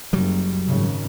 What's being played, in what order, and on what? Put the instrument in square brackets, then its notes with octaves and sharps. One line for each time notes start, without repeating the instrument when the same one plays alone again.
[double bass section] F#1 [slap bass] F#3 G3
[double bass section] G#1 C#3